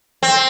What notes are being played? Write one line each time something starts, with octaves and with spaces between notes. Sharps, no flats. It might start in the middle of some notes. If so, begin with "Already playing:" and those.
C4